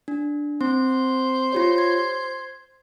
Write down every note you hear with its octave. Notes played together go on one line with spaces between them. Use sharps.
D4
C4 C5
F4 G4 C#5
G#6